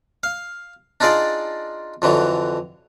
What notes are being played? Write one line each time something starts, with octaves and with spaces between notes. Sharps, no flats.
F5
D4 D#4 F4 G#4 D5 D#5
F2 D3 E3 F#3